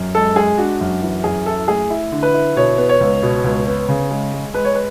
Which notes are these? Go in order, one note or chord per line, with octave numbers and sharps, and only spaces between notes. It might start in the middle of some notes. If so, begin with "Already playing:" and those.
Already playing: F#2
G#3 A4
G#3 G#4
D4 F#4
F#2
E3
F#2 G#4
E4 A4
A3 G#4
E4
D3
B4
E4
B2 C#5
B3
C#5
C#2
B2
C#2
B3
C#3
G#3
G#3
G#3 B4
C#5
B4